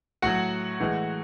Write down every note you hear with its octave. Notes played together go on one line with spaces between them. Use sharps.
A2 F#3 F#4 F#5
A2 E3 G#3